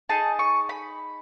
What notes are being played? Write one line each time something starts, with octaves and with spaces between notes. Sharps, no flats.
D#4 G#4 A5
C#6
B5